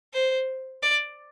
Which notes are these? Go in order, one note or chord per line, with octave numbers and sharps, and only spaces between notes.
C5
D5